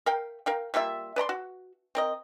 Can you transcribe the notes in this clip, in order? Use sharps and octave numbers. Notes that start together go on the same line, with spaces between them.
A#4 F5 G5
A#4 F5 G5
G3 A#3 F4 E5
B4 D5 A#5 C6
F#4
C4 A#4 D#5